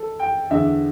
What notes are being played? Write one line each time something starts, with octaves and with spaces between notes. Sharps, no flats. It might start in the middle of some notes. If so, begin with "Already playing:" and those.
Already playing: A4
G5
E2 D3 E5